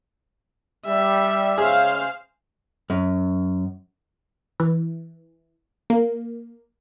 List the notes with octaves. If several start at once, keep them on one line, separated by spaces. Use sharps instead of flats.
G3 E5
C#3 G#3 C#4 G#4 C5 F5
F#2
E3
A#3